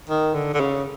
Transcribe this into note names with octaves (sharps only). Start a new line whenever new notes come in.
D#3
D3
D3
C#3